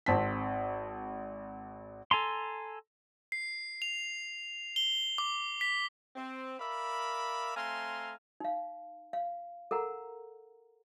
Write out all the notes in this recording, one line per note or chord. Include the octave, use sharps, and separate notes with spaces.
G#1 C4 A5 B6
A4 G#5 A#5 C6
C7
F7
G7
D6
B6
C4
A#4 D5 E5 F5 B5
A3 C4 F5 G#5 A#5 C6
D#4 F5
F5
A4 A#4 F#5 A#5